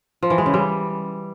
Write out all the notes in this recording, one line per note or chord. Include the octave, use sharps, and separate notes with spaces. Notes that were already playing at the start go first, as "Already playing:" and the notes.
F3
E3
G#3
C#3
G3